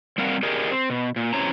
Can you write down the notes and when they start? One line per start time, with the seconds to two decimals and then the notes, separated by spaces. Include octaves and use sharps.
0.18 G3 C4 A#4 F5 F#5
0.43 G4 G#4 A#4 D5 D#5
0.71 C4
0.90 B2
1.16 A#2
1.33 C3 E3 C#4 C#5 G#5 A#5